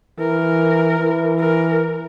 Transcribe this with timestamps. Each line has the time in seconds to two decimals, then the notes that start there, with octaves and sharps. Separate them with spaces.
0.19 E3 A#4
0.99 E3
1.39 A#4